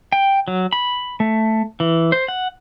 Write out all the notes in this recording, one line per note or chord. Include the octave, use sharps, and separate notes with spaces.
G5
F#3
B5
A3
E3
C5
F#5